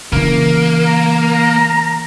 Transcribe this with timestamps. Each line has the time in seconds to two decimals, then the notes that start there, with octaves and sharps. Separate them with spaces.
0.12 C#3 E3 A#3
0.86 A#5